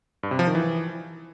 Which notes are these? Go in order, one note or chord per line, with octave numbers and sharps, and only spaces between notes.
G2
C3
F3
D#3
E3